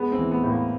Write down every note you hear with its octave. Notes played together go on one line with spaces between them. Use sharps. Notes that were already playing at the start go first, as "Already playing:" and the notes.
Already playing: G#3 B3
C4
E3
B3
A2
A#3